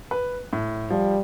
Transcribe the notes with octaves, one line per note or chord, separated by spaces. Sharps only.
B4
A2
F3 G3